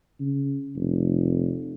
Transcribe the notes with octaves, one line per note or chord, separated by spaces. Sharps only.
C#3
F1